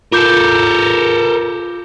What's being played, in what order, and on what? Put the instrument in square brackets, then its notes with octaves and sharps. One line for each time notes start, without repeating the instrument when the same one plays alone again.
[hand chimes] F4 D6 G6 [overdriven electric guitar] A4 A#4